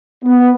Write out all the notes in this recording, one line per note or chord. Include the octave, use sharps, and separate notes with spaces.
B3